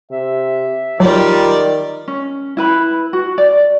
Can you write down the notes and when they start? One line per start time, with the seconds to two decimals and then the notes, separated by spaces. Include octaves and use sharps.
0.11 C3 E5
1.00 D#3 F#3 G3 F4 A#4 D5
2.08 C#4
2.57 E4 B4 B5
3.13 F#4
3.38 D5